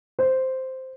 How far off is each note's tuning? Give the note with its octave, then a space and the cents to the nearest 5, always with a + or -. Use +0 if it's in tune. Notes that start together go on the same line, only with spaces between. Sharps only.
C5 -5